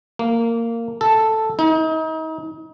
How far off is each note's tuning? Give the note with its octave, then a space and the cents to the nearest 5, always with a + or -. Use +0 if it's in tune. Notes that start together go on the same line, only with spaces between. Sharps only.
A#3 -15
A4 +0
D#4 +35